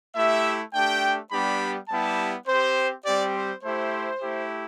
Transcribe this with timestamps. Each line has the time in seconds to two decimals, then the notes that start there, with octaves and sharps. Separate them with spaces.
0.15 A3 E4 G4 E5
0.73 A3 D4 G4 G5
1.30 G3 B3 D4 G4 B5
1.88 G3 B3 E4 G4 A5
2.47 C4 G4 C5
3.05 G3 C4 G4 D5
3.35 C5
3.63 A3 E4 G4 C5
4.21 A3 E4 G4